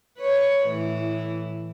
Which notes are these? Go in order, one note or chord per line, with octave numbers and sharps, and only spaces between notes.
B4 C#5
A2 E3